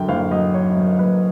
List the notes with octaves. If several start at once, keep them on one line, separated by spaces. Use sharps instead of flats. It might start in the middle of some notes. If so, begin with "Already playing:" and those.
Already playing: F#2 D3 G5
F#1 F5
F#3 D#5
D3 C#5
F#2
F#1 B4